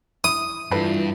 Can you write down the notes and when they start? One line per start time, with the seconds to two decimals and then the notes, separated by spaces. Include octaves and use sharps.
0.24 E4 D#6
0.71 G2 E3 A3 D4 F4 B4